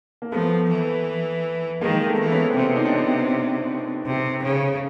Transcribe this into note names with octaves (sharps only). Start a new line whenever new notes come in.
A#3
F3 A3 B3
E3
D#3 G#3 A#3
A3 B3
E3
B3 C#4
C4
C3 B3 C#4
D#4
D4
B3 C#4
C3
C#3